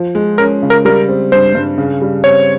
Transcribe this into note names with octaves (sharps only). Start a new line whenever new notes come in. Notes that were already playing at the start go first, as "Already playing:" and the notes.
Already playing: F3
G#3
C#4 A#4
C#3
A#4
G3 A#4
C4
G2 C5
G2
C#3
G3
C4 C#5